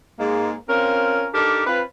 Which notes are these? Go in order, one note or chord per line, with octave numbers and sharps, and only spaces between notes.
G#2 G#3 A#3
C4 C#4 F4 A#4
D4 D#4 G4 A4 A#4
C4 F4 B4